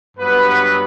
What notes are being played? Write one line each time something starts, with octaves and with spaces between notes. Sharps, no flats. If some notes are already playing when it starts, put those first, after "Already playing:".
G2 F#3 B3 B4
B4